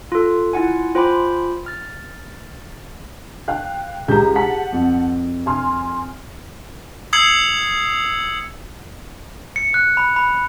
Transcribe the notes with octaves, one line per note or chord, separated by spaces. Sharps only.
F4 A4
E4 F4 F#5 G#5
F4 C5 G5 G#5 B5 D6
F6 A6
F5 G5 F#6
C#2 G4 G#4 A#5 G6
F#5 A5 B6
F2
G#5 C6 F6
D#6 E6 G#6 C7 C#7 F#7
C#7
F#6
B5
B5